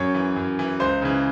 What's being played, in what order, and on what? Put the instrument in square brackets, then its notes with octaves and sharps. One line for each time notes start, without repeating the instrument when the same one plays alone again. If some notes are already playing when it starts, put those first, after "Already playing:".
Already playing: [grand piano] F#2 C#5
E3
F#2
E3
C#2 C5
C#3 E3